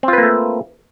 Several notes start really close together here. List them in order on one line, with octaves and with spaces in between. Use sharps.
C4 F4 B4 A#3 A3